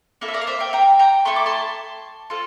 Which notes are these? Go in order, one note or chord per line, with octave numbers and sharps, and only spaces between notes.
A#3 E4 A4
E5
A#4 D5
F5
C5 E5
E5 G5
G5 A#5
G5 A#5
A3 E4 A4 C6
D6
A5 C6
C4 F4 A4